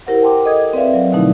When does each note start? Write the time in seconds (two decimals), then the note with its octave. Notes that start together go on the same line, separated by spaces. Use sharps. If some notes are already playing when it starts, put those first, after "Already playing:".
0.07 E4 G4 A#4 C5 F#5
0.22 G5 A5 C6 D6
0.45 A4 D#5 D6 D#6 G#6
0.73 C4 B4 D5 E5 F5
0.93 F#3
1.12 B2 D3 F3 A3 D#4 E4